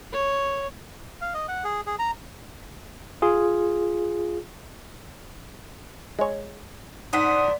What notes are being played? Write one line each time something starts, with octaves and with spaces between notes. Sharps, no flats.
C#5
F5
D#5
F#5
G#4
G#4
A#5
F4 G#4
G#3 C#5
G#2 D4 C5 F#5 D#6 B6